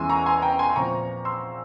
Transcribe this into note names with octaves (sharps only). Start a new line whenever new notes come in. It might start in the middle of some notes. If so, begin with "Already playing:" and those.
Already playing: E2 E3 G#3 C#4 G#5 C6 E6
A#5 C#6
G#5 C6
G5 A#5
G#5 C6
C6
A#2 F3 C4 A#5 C#6
C6 E6